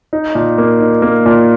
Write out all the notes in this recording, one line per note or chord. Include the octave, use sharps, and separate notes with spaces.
D#4
A#2
A#3
D#4
A#3
A#2